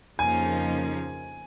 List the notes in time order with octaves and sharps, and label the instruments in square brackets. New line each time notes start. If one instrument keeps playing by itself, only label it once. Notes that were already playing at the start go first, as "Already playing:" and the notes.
[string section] F2 C#3 F3 A#3 D#4 [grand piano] G#5